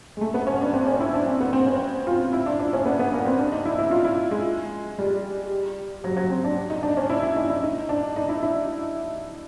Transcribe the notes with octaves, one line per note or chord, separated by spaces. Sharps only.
G#3
A3
B3
C#4
D4
C4
C#4
E4
D4
C4
B3
C4
C#4
F4
E4
D4
D4
C#4
B3
B3
A#3
C4
D4
D#4
E4
E4
F4
E4
G#3
G3
F#3
F#3
C4
D4
D#4
D4
C#4
E4
E4
D#4
E4
D#4
D4
D#4
E4
E4